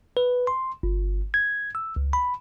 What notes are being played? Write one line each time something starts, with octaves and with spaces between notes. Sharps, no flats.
B4
C6
G1
G#6
E6
C#2
B5